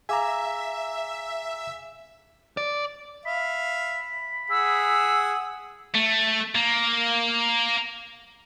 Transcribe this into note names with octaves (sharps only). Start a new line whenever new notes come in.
G#4 E5 F5 G#5 A#5 D6
D5
E5 F5 B5
G#4 F#5 E6
A3
A#3